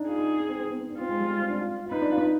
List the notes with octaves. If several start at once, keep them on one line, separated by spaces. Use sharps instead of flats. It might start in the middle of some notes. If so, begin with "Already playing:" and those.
Already playing: D4 D#4
F4 G#4
D#4
D#4
C4
C4
B3
C4
D4
C4 F4
G#3
G3
G#3
C4
D4
F4
F4
D#4 B4
D4
F4
D4
D#4